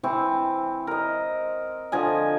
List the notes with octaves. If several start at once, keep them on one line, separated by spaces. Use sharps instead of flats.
E3 C4 C#6
A#4 D#5
D3 F3 D#5 G#5